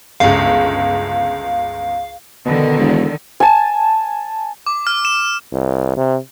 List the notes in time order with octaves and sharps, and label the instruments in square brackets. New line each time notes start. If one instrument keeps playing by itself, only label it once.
[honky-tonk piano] G1 C#2 [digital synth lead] F5
[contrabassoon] B2 [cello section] D3 D#3
[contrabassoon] E1
[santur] G#5 A5
[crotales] D6
F6
E7
[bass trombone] C2
C3